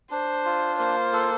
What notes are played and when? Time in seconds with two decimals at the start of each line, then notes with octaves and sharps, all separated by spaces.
0.11 D4 C5
0.45 F4
0.79 A#3 C5
1.13 A4